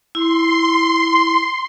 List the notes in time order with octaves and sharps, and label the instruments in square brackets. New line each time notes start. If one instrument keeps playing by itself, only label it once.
[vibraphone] E4 [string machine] C6